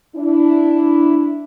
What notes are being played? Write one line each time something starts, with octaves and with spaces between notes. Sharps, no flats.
D4 E4